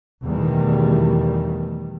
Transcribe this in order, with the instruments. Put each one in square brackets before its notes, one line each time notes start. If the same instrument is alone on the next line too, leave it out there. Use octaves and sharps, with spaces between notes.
[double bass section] E2 B2 D#3 G3 A3